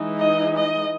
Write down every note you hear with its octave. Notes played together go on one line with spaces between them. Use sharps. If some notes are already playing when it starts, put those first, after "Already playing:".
Already playing: E3 G#3 D#4
D#5
D#5